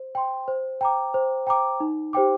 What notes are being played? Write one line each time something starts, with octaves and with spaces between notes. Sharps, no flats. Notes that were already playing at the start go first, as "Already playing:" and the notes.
Already playing: C5
G5 C6
C5
G5 A#5 D6
C5
G5 A#5 D6
D#4
G4 C5 G5 D6